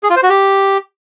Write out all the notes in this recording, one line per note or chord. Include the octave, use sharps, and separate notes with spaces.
G#4
F4
C5
F#4
G4